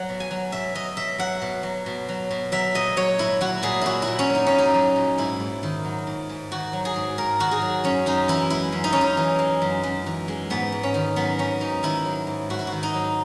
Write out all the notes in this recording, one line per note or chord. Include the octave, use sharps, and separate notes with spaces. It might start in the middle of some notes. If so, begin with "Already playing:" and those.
Already playing: F#3 F#5
B2
G#5
F#3
B2 E5
F#3 D#5
B2 E5
F#3 F#5
B2
F#3
B2
F#3
B2
F#3 E5
A#2 D#5
F#3 C#5
A#2 E4
F#3 F#4
A#2 G#4
F#3 E4 F#4
E4
A#2
C#4
F#3 D#4
C#4
A#2
D#4
F#3
A#2
G#2 E4
G#2
D#3
F#3
G#2
G#2
D#3 F#4
F#3
G#4
G#2
G#2 A#4
D#3 F#4
G#4
F#3
F#2 C#4
F#2 D#4
E3 E4
G#3 E4
F#2
D#4
F#2 C#4
D#4
E3
G#3
F#2
F#2
E3
G#3
G#2 B3
G#2
C#4
D#3
F#3 B3
G#2 C#4
G#2 D#4
D#3 E4
F#3
G#2
G#2 F#4
E4
D#3 F#4
D#4
F#3